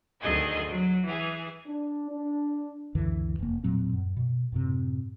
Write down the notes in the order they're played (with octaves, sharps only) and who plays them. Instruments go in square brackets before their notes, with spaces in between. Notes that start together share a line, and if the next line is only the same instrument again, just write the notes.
[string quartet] D2 D#3 G#4 A4 D#5 G#5
F#3
E3 G#4
[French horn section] D4
D4
[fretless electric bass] C#2 F#2 D3 E3
F1 A#3
E1 A#2 F#3 C4
F#2
B2
F#2 A2 C3